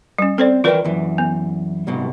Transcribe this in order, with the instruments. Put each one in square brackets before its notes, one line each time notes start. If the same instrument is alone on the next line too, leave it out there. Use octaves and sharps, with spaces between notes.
[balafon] G3 C#4
[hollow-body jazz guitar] C4 [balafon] A4 C5 D5
[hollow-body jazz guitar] E3 A#4 G5 [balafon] F4 B4 D5
[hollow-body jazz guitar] F#2 E3
[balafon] B3
[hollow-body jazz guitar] C2 G#2 B2